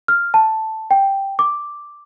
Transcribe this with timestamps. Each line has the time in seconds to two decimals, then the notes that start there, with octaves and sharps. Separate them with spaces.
0.08 F6
0.34 A5
0.91 G5
1.39 D6